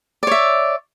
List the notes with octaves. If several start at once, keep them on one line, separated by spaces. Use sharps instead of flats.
C#5 D5 E5